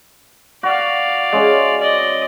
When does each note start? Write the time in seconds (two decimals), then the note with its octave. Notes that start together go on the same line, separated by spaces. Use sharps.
0.63 F#4 D5 F5
1.32 G#3 C#4 C#5
1.80 D5 D#5